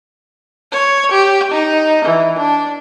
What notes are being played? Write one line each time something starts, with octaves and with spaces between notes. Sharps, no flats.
C#5
G4
D#4
E3
D4